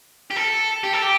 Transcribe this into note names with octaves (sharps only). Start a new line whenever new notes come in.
G4
A4
G4
A4
G4